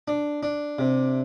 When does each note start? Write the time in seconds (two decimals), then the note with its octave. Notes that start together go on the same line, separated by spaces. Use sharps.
0.08 D4
0.43 D4
0.79 C3